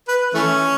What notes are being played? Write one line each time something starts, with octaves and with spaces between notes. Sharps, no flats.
B4
E3 A3 C#4